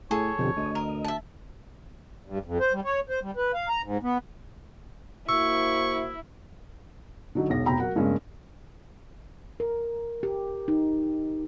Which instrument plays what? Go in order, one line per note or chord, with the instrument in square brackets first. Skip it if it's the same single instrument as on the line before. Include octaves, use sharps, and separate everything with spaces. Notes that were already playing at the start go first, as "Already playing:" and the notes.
[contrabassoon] A2 [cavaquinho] G#4 A4 [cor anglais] C#5
[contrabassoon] F2 [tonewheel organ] B2 D3 G4
[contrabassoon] D2 [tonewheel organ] D#5
[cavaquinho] A#4
E5 A5
[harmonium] G2
F2
C5
G3
C#5
C5
G3
B4
F5
A#5
G#2
B3
[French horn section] A#3 F#4 C5 [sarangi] E4 [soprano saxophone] C#6 [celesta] E6
[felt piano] D3 F#3 D#4
E1 B1 A#6
F1 B2 F#4 G5 A#5 B5
F#3 A#4 F#5
E2 G2 C#3 G#3 A#3 C#4
[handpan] A#4
G4
D#4